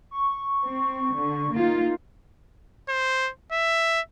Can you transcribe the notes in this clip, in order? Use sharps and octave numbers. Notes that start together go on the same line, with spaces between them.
C#6
C4
D3
A#3 D#4 F4
C5
E5